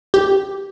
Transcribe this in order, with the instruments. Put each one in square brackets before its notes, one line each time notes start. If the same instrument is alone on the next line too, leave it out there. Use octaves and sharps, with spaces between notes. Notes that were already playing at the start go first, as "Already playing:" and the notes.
[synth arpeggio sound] G4